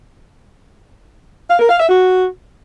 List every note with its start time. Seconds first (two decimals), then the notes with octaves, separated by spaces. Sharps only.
1.50 F5
1.59 A#4
1.69 F5
1.78 E5
1.87 F#4